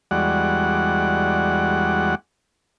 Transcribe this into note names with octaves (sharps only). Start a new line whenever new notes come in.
E2 G3 G#3 F#4 D5 F#5